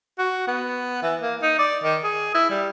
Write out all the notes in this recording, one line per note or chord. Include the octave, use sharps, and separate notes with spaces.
F#4
B3
E3
A#3
D#4
D5
D#3
G#4
E4
G3